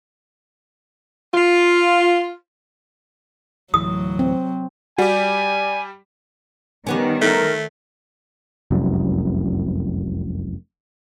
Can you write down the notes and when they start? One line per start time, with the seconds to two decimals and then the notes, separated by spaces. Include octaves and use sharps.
1.34 F4
3.74 D2 A2 E3 F#3 D#6
4.19 C4
4.98 G3 F#4 G4 D5 G#5
6.87 D#3 G3 B3 C#4
7.22 A3 A#4
8.71 F1 C2 F#2